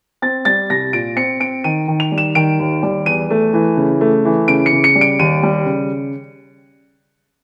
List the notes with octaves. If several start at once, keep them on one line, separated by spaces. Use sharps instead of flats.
C4 A6
G3 A6
C2 A#6
A#2 D7
C4 C#7
C4 D7
D#3 D#7
D#3
F7
G3
E7
D#3 D7
D#2
G3
E2 D#7
A3
E3
C#3
A3
E3
C#3 D7
C#7
C#3
C#7
G3
D7
D#2 D#7
G3
C#3